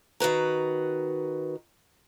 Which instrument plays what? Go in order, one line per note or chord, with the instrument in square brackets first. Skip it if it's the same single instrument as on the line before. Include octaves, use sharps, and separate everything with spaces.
[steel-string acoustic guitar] D#3 F#4 B4 A#5